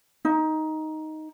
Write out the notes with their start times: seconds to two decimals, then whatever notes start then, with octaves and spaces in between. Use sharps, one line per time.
0.25 D#4